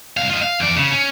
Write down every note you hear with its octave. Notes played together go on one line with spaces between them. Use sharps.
C2 F5
F4 D#5
F5
E2 D5
C#3
C#4